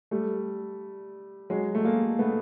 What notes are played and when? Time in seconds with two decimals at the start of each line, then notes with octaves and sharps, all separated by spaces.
0.11 G3 A3
1.50 F#3 G#3
1.75 A3
1.84 G#3 A#3
2.19 A3 B3